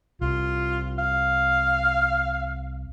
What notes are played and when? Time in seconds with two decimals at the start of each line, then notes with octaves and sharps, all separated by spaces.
0.21 C2 F4
0.98 F5